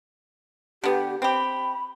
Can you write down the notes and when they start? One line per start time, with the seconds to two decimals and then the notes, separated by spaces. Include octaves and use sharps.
0.84 D3 B3 G4
1.22 C4 G4 B5